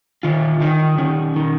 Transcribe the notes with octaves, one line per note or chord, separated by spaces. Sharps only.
D#3 F4
D#3 D#4
D#3 C#4
D#3